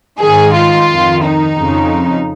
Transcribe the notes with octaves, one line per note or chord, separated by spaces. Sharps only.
G#2 D#3 G#4
F4
F2 D#3
D#4
F2 C#3